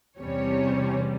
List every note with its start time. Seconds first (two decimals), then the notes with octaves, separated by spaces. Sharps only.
0.19 E2 C3 G3 C#4 C#5